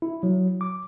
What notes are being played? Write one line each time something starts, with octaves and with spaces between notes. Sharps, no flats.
E4
F#3
D6